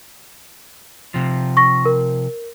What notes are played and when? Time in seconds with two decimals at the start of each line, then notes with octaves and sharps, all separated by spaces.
1.14 C3 F3
1.57 C#6 A#6
1.86 A#4